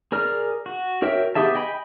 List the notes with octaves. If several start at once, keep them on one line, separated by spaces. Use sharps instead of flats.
G#4 A#4 D5 F6
F#4
F#4 A#4 C#5 E5 G5
B3 G4 G#4 E5 A5
D#5 G5 G#5 B5